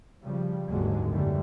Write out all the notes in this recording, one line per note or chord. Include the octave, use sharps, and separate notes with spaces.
C#3 F3 G3
F#1 D#2 G#2 D3 F#3 G#3
A1 F#2 D3 E3 G3 A3